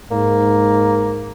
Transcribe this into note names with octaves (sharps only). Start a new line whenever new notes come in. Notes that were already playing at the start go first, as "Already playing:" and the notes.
G#2 A#3